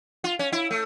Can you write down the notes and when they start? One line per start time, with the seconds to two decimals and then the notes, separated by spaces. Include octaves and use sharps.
0.24 F4
0.39 C#4
0.52 E4
0.71 A3